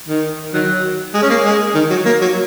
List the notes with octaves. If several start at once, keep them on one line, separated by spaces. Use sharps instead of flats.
D#3
D#3 F#3
G#3
C#4
A#3
G#3
D#3
F#3
A#3
F#3